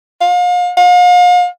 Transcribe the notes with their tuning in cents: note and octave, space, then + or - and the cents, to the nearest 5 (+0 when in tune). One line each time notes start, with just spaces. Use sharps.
F5 +35
F5 +40